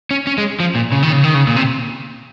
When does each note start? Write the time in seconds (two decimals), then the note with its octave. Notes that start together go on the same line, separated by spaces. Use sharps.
0.11 C#4
0.27 C#4
0.38 G#3
0.60 F3
0.75 A#2
0.92 C#3
1.03 D#3
1.13 C#3
1.24 D#3
1.34 C#3
1.47 A#2
1.56 C3